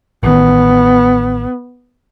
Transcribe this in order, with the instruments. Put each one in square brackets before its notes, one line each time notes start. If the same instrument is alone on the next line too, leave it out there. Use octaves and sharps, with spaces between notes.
[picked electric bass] A1 D#3 [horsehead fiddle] B3